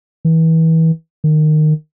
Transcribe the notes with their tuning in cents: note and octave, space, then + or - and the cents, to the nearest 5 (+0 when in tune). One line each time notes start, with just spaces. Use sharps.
E3 -30
D#3 -20